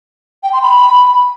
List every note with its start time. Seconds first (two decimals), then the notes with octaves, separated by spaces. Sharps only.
0.43 G5
0.53 C6
0.62 B5